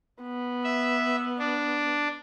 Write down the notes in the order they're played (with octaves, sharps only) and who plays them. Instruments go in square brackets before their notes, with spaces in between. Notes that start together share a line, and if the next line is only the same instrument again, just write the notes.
[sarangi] B3
[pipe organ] E5
D4